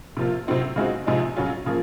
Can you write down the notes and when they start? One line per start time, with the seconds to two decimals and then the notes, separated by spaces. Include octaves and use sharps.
0.17 C3 F3 A#3 F4
0.47 C3 F#3 C4 D#4
0.76 C#3 G#3 C4 D#4 F#4
1.06 C3 F3 G#3 D#4
1.36 C#3 F#3 C#4 F4
1.66 C#3 F3 A#3